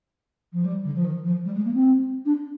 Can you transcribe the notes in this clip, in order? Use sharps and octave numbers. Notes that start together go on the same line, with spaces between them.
F3
G3
D3
F3
D#3
F3
G3
G#3
A#3
C4
D4